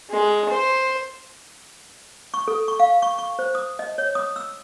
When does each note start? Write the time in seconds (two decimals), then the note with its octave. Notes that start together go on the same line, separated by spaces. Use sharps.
0.10 G#3
0.50 C5
2.34 C#6
2.48 A4
2.68 C#6
2.80 F5
3.02 C#6
3.19 C#6
3.39 C5
3.55 D#6
3.79 D#5
3.98 C#5
4.15 D#6
4.36 E6